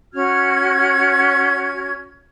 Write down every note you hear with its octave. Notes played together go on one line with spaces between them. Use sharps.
C#4 F#4 F6 G#6